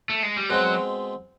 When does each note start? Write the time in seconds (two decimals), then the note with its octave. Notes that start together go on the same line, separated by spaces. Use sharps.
0.10 A3
0.23 G#3
0.37 G3
0.50 B2 F#3 G#3 C4